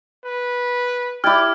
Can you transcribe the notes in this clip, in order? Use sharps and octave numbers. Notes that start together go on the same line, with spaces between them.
B4
E4 G4 D5 F6 G#6